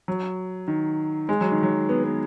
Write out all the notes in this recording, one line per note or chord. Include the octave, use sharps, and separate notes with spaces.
F#3
D#3
G#3
F#3
D#3
F#3
B3
B3